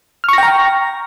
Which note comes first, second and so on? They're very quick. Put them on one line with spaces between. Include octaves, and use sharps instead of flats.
F6 C#6 A#6 G5 A#5